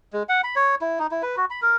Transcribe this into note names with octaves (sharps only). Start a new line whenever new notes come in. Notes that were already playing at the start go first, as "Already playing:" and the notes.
G#3
F#5
B5
C#5
E4
D#4
E4
B4
F#4
B5
A#4